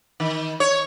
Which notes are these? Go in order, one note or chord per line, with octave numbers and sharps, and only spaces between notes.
D#3
C#5